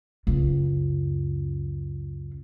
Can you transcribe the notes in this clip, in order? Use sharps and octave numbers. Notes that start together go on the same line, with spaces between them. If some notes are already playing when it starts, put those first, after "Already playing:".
C#2 F#2